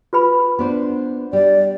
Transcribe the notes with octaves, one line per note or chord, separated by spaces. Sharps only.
F4 B4 B5
B3 D4 C5
G3 D5